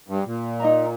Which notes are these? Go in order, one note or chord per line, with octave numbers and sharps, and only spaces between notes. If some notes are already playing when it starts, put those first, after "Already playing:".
G2
A#2
D#4 A#4 D#5 A#5